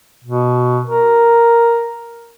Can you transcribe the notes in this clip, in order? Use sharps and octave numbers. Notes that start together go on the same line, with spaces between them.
B2
A#4